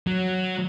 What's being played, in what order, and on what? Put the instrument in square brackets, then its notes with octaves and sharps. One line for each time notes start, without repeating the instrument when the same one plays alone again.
[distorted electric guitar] F#3